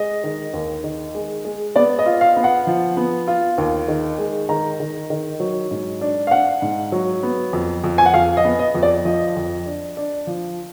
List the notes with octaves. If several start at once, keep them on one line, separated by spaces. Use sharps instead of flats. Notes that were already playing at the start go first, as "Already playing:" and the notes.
Already playing: G#3 D#5
D#3
D#2
D#3
G#3
G#3
B3 D5
D#5
F4
F5
B3
F#5
F3
B3
F4
D#2
D#3
G#3
D#3 A#5
D#3
D#3
F#3
G#2
D4
F5
D4 F#5
G#2
F#3
B3
F2
F2
G#5
F#5
F2 F5
D#5
B3
D#5
F2
D5
F3 D#5
F2
D4
D4
F3